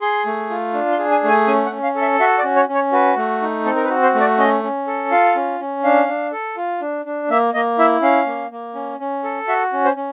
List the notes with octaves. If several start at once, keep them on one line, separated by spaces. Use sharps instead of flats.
G#4 C6
A3
F4
D4
C6
G#4
G#5
A3 G#5
C#4 G#5
F#5
C#4
F5
A4
E5
F#4 E5
D5
C#4
C#5
C#4
C#5
F#4 B4
A3
D#4
C4 A4
A#4
B4
F#4
C5
A3
D5
C#4 D#5
C#4
A4
F4 F5
C#4
C#4
D4 F5
D4
A4
F4
D4
D4
A#3 E5
A#3 D#5
E4 E5
C#4 F5
A#3
A#3
C#4
C#4
A4
F#4 E5
C#4
C5
C#4